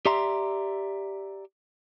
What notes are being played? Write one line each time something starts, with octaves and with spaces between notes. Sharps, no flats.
G4 D5 E5 A#5 C6